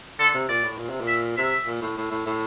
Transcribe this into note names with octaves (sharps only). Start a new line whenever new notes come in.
D3 A4
C3
A#2 D5
A2
A#2
C3
A#2
E5
C3 E5
A#2
A2
A2
A2
A2